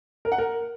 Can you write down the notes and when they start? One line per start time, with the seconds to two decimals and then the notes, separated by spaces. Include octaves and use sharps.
0.25 A#4
0.32 F#5
0.38 A#4